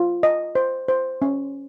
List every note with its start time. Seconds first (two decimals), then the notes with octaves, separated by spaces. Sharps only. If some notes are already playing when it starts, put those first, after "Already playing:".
Already playing: F4
0.23 D#5
0.55 C5
0.88 C5
1.22 C#4